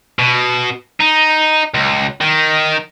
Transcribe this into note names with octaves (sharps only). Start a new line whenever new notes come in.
B2
D#4
C#2
D#3